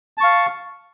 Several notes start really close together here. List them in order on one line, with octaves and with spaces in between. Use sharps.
A5 C#6 F5